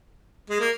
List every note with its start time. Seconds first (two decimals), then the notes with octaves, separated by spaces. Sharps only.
0.50 G#3
0.60 A#3